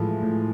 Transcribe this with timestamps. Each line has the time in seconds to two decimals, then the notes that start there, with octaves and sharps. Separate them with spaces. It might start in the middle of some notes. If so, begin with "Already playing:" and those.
Already playing: A2 E3 F3 G#3 A3 E4
0.23 A2